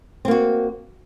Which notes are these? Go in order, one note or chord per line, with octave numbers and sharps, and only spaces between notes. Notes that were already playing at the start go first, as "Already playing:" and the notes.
A#3 C4 F#4